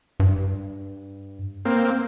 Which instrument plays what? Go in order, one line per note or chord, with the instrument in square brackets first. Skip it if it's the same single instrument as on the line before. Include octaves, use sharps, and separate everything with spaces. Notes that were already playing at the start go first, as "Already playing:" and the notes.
[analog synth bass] G2
[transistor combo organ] A#3 C4